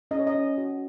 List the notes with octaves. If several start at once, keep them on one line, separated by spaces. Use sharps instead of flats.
C#4 D#5
C#5
D#5
C#4
F#4